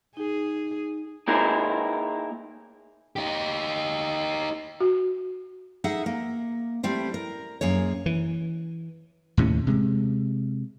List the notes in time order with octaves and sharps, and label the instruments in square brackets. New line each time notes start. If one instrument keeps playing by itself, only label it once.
[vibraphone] D#4 [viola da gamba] G#4
[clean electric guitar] A#3 D#4 E4 G#4 A#4
[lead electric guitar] D#4 G4
[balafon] F#4
[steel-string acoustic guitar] D#4 G#4 E5 F#5
A#3
G3 A3 C4 E4
A#4
F#2 A#3 G#4 C#5
[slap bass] E3
D#2 A2 C3 C#4
C3 G#3